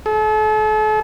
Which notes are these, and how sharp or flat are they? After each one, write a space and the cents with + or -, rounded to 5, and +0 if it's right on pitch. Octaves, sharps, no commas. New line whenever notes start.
A4 -40